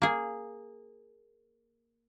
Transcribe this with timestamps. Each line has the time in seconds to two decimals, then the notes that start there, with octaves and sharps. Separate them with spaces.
0.02 A#3 G#4